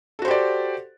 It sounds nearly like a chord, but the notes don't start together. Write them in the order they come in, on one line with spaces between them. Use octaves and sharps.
A4 F#4 C5 G4 D5